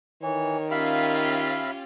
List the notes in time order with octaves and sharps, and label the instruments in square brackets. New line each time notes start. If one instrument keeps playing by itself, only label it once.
[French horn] D#3 [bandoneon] E3 [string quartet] C#5
[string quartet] C#4 F4 G4 [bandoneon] E5 F5 B5